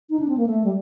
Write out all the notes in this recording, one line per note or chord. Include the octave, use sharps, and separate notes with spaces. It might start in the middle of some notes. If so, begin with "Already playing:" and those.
D#4
D4
C4
A#3
A3
G3